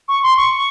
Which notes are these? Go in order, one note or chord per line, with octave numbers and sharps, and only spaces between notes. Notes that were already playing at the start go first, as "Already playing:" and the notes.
C#6
C6
C#6